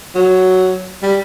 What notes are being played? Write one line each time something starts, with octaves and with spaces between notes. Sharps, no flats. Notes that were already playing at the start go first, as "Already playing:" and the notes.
F#3
G3